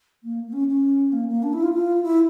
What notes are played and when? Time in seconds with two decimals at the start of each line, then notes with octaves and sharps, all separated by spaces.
0.23 A#3
0.46 A#3
0.53 C#4
0.68 C#4
1.12 A#3
1.28 A#3
1.43 D4
1.53 E4
1.63 F4
1.73 F4
2.03 E4